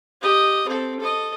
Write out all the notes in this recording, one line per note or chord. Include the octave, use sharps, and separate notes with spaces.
G4 D#5
C4 A4
A4 D#5